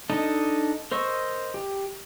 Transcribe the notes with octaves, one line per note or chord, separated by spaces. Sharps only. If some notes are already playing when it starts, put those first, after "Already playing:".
D4 D#4 A4 D#5
A#4 C5 D#5 C#6 E6
G4